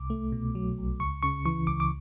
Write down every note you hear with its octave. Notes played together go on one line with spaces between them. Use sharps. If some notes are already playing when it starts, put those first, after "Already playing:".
Already playing: C2 D6
A3
B2
F#3
B1
C#2 C#6
C#3 C#6
E3 C#6
C#2 D6
D6